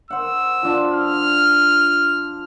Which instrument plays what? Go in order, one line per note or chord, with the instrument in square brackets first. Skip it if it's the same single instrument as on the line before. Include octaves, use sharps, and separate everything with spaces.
[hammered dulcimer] C5 F#5 [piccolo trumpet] E6
[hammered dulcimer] F3 D4 F4
[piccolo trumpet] F6